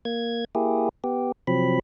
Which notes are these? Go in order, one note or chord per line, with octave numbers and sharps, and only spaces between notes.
A#3 G#6
A#3 E4 G4 G#4
B3 G4
C3 F3 F#3 C4 B5